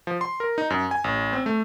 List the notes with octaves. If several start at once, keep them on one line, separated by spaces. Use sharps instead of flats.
F3
C6
A#4
D#4
F#2
G#5
A1
C4
A3